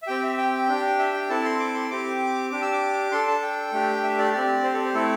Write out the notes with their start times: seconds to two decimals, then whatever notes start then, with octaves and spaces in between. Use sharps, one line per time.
0.02 E5
0.07 C4 G4 G5
0.24 E5
0.38 G5
0.69 D4 G4
0.99 E5
1.14 G5
1.30 C4 E4 A4 A5
1.45 C6
1.60 D6
1.74 C6
1.91 C4 G4 D6
2.50 D4 G4 D6
2.62 E6
2.73 D6
3.12 D4 A4 C6
3.27 A5
3.42 G5
3.73 A3 D4 G4
4.03 E5
4.19 D5
4.34 C4 G4
4.63 C5
4.74 A4
4.84 C5
4.94 A3 C4 E4 A4